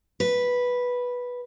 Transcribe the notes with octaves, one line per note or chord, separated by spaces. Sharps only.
B4